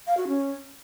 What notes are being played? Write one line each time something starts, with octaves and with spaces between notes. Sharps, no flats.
F5
F#4
C#4